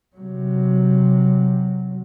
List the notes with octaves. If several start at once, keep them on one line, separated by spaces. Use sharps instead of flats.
C3 F#3